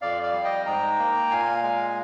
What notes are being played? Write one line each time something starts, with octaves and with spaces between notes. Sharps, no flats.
F2 D5 F5
D5 F5
G3
D#5 G5
G#2 G5 A#5
A#3
A#2 F5 G#5
G#3